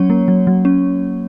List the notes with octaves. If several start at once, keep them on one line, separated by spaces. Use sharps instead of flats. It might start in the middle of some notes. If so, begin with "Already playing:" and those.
Already playing: F#3 C#4 C#5
A#3
F#3
F#3
C#4